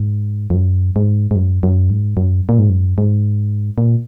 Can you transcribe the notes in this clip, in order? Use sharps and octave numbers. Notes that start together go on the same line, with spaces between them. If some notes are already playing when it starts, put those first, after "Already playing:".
Already playing: G#2
F2
F#2
G#2
G#2
F#2
F#2
G#2
F#2
A#2
G#2
F#2
G#2
A#2